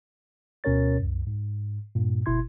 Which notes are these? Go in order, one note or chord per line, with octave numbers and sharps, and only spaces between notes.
D2 B2 C#4 A#4 C#5 A6
C2 F#2
G#2
G2 A#2
G1 B2 E4 C6 G#6